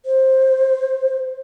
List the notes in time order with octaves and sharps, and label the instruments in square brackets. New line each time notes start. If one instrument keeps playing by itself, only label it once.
[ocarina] C5